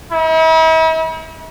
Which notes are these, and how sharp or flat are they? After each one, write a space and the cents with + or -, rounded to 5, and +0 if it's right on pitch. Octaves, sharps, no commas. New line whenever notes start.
E4 -45